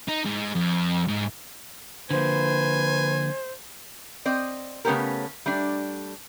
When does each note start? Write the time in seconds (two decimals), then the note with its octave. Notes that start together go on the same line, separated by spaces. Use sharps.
0.08 D#4
0.25 G#2
0.55 F2
1.08 G#2
2.10 D3 F3 A#3 B4 C5 G#5
4.25 C4 D5 D#5
4.85 C#3 A3 B3 C#4 G4 A#4
5.46 G3 A3 D4